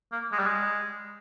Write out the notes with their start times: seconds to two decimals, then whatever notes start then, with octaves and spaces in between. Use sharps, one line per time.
0.12 A#3
0.33 G#3
0.39 G3
0.46 G#3